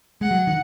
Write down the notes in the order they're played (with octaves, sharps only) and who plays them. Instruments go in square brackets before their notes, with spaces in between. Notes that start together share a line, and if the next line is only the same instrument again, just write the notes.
[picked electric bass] G#3 [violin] F#5
[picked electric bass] F#3
D#3